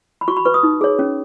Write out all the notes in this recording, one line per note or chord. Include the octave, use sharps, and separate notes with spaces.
B5
F#4 C#6
B5
B4 C#6
D#6
D#4
G#4 C#5
C#4